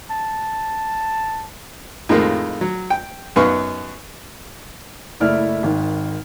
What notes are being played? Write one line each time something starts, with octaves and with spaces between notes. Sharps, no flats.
A5
F2 A2 D#3 F3 G#3 A#3
F#3
G5
F#2 B3 D#4 B4 F5 C#6
F#1 A3 E4 D5 E5 F6
G#1 D#3